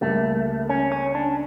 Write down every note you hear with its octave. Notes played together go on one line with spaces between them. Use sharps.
C#2 C#3 G3 A3 A#3
C#4
C#4
D4